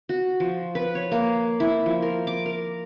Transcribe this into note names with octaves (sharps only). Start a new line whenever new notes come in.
F#4
F3
B4
C#5
A#3
E4
F3
A#4
D6
A#4